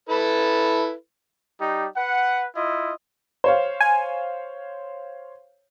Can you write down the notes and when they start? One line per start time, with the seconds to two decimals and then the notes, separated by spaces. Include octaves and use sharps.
0.09 E4 A4 B4
1.60 G3 D#4 G4
1.97 B4 F#5
2.56 E4 F4 D#5
3.44 C5 C#5 F5
3.81 G#5